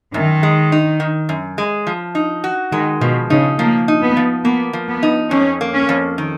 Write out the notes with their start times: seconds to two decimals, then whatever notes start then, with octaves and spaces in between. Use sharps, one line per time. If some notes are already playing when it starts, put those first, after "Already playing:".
0.14 F#2 D#3
0.43 G#3
0.72 D#4
1.00 D#3
1.29 F#2
1.58 G#3
1.87 F3
2.15 D#4
2.44 F#4
2.72 D#3 G#3
3.01 B2 F3
3.30 C#3 D#4
3.59 F3 A#3
3.88 D#4
4.02 B3
4.17 F3
4.45 A#3 B3
4.73 F3
4.89 B3
5.03 D#4
5.31 F2 C#4
5.61 A#3
5.74 C#4
5.89 F2
6.18 D#3